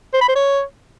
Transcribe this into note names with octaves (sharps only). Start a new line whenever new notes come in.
C5
B5
C5
C#5